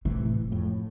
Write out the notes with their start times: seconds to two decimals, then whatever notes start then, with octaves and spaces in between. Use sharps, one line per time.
0.05 A2 C3 E3
0.52 F2 A2